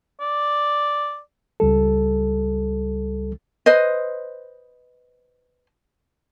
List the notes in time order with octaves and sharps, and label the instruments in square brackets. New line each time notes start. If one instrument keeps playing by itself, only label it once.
[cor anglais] D5
[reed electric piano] C#2 G3 A4
[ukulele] B4 C5 D#5